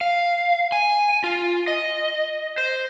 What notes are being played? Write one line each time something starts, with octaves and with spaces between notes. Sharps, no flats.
F5
G#5
F4
D#5
C5